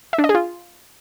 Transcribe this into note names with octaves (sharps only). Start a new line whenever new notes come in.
E5
D4
D#5
G#4
F4